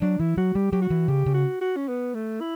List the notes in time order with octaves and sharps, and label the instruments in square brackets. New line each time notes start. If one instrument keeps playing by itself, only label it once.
[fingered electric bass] F#3 [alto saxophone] D4
[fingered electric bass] E3 [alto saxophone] E4
[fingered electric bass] F#3 [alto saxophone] F#4
[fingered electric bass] G3 [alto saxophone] G4
[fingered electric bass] F#3 [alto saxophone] G4
[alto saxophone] F#4
[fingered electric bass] E3
[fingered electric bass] C#3 [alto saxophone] G4
[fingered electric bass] C#3
[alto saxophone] F#4
F#4
C#4
B3
A3
E4